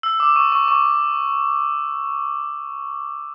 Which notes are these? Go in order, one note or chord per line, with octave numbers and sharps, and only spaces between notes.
E6
D6
C#6
C#6
C#6